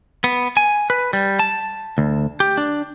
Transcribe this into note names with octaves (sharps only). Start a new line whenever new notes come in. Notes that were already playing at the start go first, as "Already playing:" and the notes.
B3
G#5
B4
G3
A5
D2
G4
D4